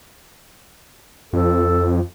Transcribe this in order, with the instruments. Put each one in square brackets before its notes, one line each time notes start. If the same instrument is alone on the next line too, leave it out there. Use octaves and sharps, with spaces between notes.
[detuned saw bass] F2 [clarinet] A4